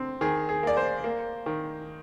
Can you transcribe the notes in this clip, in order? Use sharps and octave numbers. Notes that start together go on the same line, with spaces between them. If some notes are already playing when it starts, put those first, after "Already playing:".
Already playing: D3 C4
D#3 G#4
G#4
A#3 D5
C5
A#3
D#3